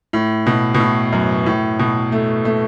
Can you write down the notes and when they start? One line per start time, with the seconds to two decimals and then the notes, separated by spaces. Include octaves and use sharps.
0.13 A2
0.46 B2
0.74 B2
0.80 A2
1.12 F#2
1.46 A2
1.79 B2
2.12 A3
2.45 A3